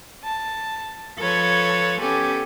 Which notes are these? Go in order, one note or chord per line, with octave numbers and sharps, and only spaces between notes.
A5
F3 A4 B4 C#5 G#6
B3 C#4 G4 A4 G#5